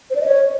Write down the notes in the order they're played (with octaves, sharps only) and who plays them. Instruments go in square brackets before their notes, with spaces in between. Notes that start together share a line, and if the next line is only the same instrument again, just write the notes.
[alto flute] C5
D5
D#5
C#5